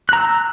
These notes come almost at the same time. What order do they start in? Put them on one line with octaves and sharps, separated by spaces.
F#6 A#5 E6